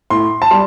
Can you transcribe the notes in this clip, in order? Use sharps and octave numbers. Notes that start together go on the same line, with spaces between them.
A2 C6
A5
G3 C6